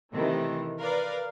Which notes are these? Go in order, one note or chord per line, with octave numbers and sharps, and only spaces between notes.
C3 D#3 E3 A3
A#4 B4 D5 F5